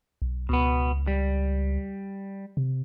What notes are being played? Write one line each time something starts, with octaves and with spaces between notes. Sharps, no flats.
B1
C#2 B2 B3
G3
C3